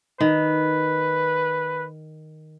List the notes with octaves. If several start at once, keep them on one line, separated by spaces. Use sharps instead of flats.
D#3 B4